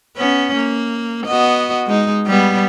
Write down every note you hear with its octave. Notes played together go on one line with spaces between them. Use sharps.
B3 C#4
A#3
B3 F#4 D#5
G#3 D#4
G3 B3